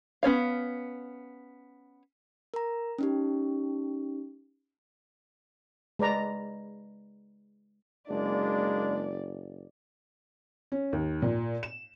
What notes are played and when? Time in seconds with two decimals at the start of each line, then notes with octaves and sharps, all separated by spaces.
0.23 B3 C#4 C#5 F5
2.54 A#4 A#5
2.98 C#4 D#4 G4
5.99 G#3 B4 D5 A#5
8.09 F#1 G#3 A#3 D4 D5
10.72 C#4
10.93 D#2
11.22 A#2
11.63 E7